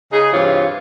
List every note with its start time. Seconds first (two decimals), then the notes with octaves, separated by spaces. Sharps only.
0.13 C#3 D#4 G#4
0.33 G2 C3 E3 F4 C#5